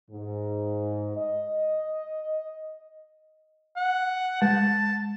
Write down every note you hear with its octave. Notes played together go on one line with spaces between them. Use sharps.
G#2
D#5
F#5
G#3 A5